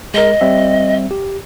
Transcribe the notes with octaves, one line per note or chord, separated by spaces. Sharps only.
G#3 A#4 D#5
G3 C4 E5
G4